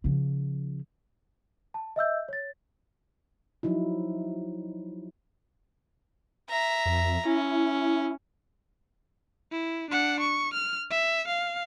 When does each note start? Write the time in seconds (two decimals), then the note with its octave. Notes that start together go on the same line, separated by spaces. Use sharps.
0.04 C#3 F3
1.74 A5
1.96 D#5 E5 E6 G6
2.29 C#5 A6
3.63 F3 F#3 D#4 E4
6.50 E5 A#5
6.86 F2
7.25 C#4 E4
9.52 E4
9.90 D4 F#5
10.20 C#6
10.53 F6
10.91 E5
11.27 F5